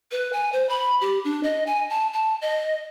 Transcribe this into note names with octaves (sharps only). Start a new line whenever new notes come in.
B4
G#5
C5
B5
G4
D4
D#5
G#5
A5
A5
D#5